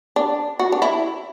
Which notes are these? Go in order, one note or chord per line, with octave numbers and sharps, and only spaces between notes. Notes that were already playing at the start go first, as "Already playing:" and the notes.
D4
F#4
D4
E4